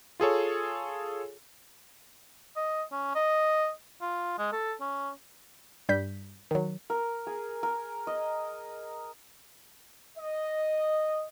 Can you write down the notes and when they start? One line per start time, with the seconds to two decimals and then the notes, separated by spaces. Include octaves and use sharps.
0.20 F4 G#4 A4 C#5
2.56 D#5
2.92 C#4
3.15 D#5
4.01 F4
4.39 G#3
4.52 A4
4.80 C#4
5.89 G2 G3 G6 B6
6.51 D#3 F#3
6.90 A#4
7.27 G#4
7.63 A#4
8.07 D#5
10.18 D#5